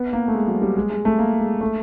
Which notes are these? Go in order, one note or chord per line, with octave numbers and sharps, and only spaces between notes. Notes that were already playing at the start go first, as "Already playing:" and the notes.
Already playing: B3
A#3
A3
G#3
F#3
G3
G#3
G#3
A3
A#3
G#3
A3